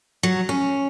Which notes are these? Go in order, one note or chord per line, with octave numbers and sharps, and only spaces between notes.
F#3
C#4